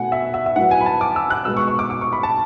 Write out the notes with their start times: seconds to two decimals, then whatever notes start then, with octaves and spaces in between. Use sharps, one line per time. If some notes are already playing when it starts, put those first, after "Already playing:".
Already playing: B2 A3 F#5 G#5
0.12 E5
0.34 E5
0.46 E5
0.56 A2 F#3 B3 F#5
0.71 G#5
0.81 B5
0.86 A5
1.01 D6
1.16 E6
1.30 F#6
1.45 B2 G#3 B3 E6
1.57 C#6
1.68 C#6
1.79 D6
1.90 D6
2.01 C#6
2.13 B5
2.23 A5